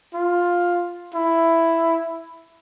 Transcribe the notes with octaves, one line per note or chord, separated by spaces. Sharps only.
F4
E4